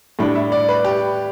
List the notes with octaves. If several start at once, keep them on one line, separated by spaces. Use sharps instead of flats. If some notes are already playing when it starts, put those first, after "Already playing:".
A2 G3 D4
E5
D5
B4
G4